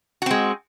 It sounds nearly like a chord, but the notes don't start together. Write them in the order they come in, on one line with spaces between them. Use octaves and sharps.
F#4 C4 G#3